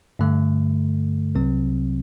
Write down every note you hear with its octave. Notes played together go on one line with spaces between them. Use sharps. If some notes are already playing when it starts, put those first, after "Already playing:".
G2 D3 A3
C2 C3 F#3 C4